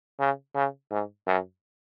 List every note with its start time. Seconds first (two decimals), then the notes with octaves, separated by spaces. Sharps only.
0.19 C#3
0.55 C#3
0.91 G#2
1.27 F#2